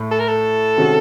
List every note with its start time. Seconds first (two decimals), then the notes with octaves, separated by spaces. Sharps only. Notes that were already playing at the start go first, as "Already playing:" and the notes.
Already playing: A2 A3
0.11 A4
0.20 A#4
0.28 A4
0.77 C3 D#3 G#3 C#4 F#4